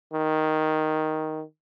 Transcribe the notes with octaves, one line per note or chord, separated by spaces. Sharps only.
D#3